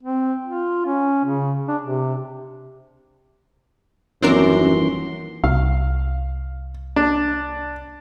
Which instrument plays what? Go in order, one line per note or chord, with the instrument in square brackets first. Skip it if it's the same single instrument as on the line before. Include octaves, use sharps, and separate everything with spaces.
[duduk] C4
F4
C#4
C#3
D4
C3
[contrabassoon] D#1 [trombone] F#2 [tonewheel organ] E3 C6 [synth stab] C4 D4 A#4
[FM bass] C2 [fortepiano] F5
[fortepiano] D4